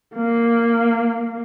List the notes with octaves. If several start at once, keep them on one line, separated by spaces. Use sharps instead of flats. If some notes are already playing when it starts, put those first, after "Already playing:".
A#3